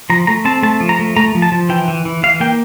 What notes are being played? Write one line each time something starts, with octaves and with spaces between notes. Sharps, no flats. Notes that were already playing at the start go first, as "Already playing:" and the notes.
F3 A#5
A3 A#5
C4 A5
A3 A5
F3
A#5
A3
A3 A#5
F3
A5
F3
E3 G5
E3
E3
E3 F5
A#3 G5